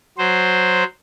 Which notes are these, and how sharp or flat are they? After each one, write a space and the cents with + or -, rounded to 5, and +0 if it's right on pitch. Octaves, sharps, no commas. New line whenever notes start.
F#3 -5 C5 +0